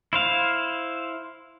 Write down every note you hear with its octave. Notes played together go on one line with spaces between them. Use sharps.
E4 C5 F5